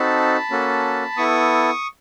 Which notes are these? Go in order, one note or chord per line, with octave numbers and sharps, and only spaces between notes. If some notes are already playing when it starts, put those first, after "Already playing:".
Already playing: C4 D#4 F#4 A4 A5 B5
A#3 C#4 F#4 A4
B3 E4 A4 C#6 D#6